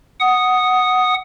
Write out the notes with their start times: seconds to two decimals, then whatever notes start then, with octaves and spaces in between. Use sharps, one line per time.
0.20 F#5 D#6